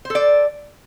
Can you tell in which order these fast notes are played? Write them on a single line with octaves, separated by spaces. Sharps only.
C5 A4 D5